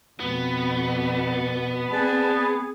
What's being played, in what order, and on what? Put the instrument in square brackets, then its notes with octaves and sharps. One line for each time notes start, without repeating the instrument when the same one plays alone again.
[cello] F2 B2 [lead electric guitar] B3
[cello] C4 [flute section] G#4 [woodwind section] B4 D5 A5